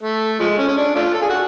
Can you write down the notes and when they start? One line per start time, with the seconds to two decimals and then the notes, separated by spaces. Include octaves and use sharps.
0.03 A3
0.40 F3 G#3
0.58 C#4
0.68 C#4
0.77 D4
0.95 A3 D4 F4
1.14 A4
1.22 G#4
1.30 F#4